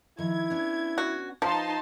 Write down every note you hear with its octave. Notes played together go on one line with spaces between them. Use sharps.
D#3 F3 E4 G#6
B3 C#4 D4
F#4
F3 D#4 B4 F5 A5 C6